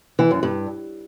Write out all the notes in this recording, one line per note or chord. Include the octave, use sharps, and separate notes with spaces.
E3
F#2
G2